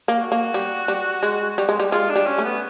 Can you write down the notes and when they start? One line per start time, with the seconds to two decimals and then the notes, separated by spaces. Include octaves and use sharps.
0.08 A#3
0.20 F#4
0.32 A#3
0.54 G3
0.88 G3
1.23 G#3
1.58 G3
1.69 G#3
1.80 G3
1.92 G#3 F4
2.09 D4
2.16 G3
2.27 C#4
2.38 A3
2.44 B3